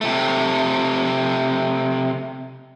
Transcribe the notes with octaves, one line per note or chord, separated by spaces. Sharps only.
C3 A3